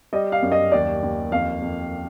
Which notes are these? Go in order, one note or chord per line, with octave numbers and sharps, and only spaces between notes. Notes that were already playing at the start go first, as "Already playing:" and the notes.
G3 D#5
F5
F#2
D#5
D#2 D5
D#2
F2 F5
F2